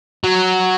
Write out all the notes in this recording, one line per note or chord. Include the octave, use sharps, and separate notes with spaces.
F#3